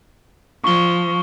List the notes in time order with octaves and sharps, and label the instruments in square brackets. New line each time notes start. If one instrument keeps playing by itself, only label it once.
[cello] F3 [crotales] C#6 G7